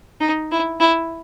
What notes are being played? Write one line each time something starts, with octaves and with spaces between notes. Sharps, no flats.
D#4
E4
E4